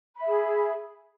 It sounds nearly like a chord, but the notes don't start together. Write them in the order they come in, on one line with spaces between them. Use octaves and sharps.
B5 E5 G#4